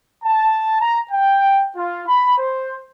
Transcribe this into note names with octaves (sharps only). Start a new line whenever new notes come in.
A5
A#5
G5
F4
B5
C5